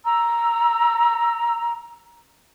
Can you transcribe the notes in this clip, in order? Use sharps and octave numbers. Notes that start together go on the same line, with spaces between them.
A#5 E6